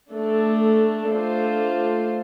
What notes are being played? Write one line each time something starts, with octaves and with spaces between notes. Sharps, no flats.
A3 D4 A4
A3 D4 F4 A4 C5